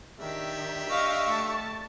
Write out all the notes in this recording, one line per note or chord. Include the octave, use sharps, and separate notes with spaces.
D#3 D4 G4 E5
D#5 F5 C#6
A3 A5